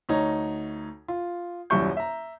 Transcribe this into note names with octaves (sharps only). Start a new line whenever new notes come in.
D2 D#4 C#5 A#5
F4
D#1 F#2 G3 E4 C#6 G6
E5 A#5